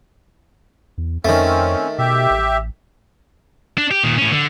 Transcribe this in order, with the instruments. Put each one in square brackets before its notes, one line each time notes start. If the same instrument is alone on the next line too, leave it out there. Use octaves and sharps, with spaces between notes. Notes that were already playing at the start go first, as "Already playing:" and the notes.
[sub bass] E2
[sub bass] F2 [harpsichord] D#3 A3 [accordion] C4 C#4
[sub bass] B2 [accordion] G4 E5
[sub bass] A1
[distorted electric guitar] D4
G4
A#2 D#3
A2 C#4
D3